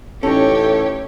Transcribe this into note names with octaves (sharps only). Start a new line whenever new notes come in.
A1 A2 C#4 D#4 G4 A4 C#5